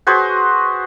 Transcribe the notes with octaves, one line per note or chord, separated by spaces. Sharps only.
F#4 G#4 B4 C5